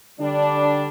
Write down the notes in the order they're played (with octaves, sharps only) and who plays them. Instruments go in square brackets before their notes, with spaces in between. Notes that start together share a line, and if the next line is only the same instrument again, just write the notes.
[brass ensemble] D3 G3 D4